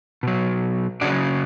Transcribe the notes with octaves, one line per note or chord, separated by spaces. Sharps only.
B2 F#3
C#3 F#3 D4 F#4